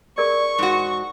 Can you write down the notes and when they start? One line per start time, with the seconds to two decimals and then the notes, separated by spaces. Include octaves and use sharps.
0.18 G#4 A#4 D5 C#6
0.58 G#2 F#4